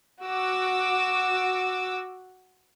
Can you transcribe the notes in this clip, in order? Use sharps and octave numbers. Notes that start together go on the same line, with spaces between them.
F#4 D6 E6